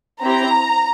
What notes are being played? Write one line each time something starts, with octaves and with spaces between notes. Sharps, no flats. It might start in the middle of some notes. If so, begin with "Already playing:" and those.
C4 E4 G4 A#5